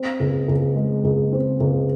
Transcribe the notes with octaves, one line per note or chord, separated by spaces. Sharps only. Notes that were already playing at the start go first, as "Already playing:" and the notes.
Already playing: C4
C#2
C#2
G#3
C#2
C4
C#2